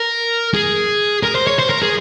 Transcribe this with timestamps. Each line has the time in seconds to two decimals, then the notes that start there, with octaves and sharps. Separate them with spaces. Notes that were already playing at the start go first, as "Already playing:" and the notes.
Already playing: A#4
0.54 G#4
1.23 A#4
1.35 C5
1.47 C#5
1.59 C5
1.70 A#4
1.82 G#4